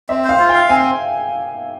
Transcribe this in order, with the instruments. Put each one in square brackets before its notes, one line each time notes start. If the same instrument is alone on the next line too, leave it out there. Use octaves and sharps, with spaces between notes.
[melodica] C4 [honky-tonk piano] E5
[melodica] C5 [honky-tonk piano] F5
[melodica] F4
[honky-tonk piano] G5
[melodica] F5
[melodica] C4 [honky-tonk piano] G#5